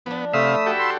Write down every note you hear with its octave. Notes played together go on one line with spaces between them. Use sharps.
F3 B3 D4
C3 A3 F5 B5 D#6 E6
F#4 G4 A4
C6